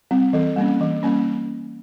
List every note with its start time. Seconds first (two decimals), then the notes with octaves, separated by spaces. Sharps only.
0.11 G3 C4
0.33 E3 A4
0.56 G3 A#3 C#4
0.81 E3
1.03 G3 A#3 C#4